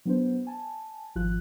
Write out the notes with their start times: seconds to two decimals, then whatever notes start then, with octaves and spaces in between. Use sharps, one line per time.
0.05 F#3 B3 D4 C5
0.47 G#5 A5
1.16 G#1 F3 F4 F#6